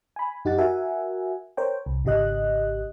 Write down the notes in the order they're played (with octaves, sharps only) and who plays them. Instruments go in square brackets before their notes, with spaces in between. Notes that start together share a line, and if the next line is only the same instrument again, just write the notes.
[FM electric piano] G#5 B5
F#2 D#4 G4 F#5 A6
F#4 A#4 E5 F#5 G#5
A#4 C5 C#5 G5
C2
G#1 C#3 G4 D#5 F#6